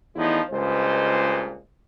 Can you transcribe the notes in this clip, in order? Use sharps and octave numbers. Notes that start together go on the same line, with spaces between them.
E2 A2 F3 D#4 E4
C#2 G2 A#2 G#3 C5